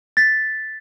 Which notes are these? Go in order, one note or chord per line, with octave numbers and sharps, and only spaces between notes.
A6 B6